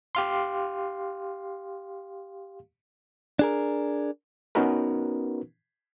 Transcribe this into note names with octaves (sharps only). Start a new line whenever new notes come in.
G4 F5 C6
D4 G#4 A#4
B3 C#4 D#4 F#4 A#4 B4